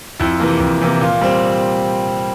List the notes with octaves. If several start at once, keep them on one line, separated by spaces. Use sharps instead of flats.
F2 E4
C3 E3 A#3
F2
C3 E3 A#3
A#2 F4
G3 C4